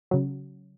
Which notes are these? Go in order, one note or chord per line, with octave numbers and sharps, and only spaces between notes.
C#3 F#3